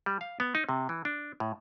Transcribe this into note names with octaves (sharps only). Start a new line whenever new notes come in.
G3
F5
B3
D#4
C3
E3
D4
A2